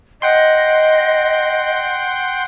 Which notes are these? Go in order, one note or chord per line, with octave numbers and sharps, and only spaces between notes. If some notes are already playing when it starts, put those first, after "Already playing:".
D#5 F#5 G5 C6